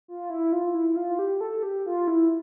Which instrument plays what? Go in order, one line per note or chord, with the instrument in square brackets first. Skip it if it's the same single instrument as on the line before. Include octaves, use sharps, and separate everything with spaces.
[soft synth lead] F4
E4
F4
E4
E4
F4
G4
A4
G4
F4
E4